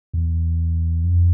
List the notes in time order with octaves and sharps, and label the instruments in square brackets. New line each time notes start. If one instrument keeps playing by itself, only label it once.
[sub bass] E2
F2